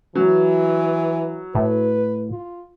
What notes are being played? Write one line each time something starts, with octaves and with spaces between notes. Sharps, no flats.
E3 F#3
A2 B4
F4